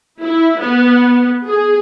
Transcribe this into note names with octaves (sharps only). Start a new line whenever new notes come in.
E4
B3
G#4